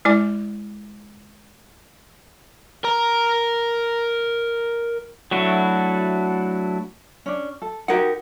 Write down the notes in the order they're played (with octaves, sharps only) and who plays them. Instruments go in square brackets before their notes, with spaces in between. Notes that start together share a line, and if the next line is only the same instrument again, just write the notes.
[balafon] G#3 E4 D5 G#5 D6
[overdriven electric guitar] A#4 A#5
[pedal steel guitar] F#3 A3 D4 E4 F#4
[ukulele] C#4 D4
A4
[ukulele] D#4 F#4 G4 [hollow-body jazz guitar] A#4 F#5